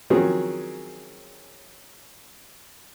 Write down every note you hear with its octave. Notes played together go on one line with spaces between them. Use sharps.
D#3 F3 F#3 C4 C#4 G#4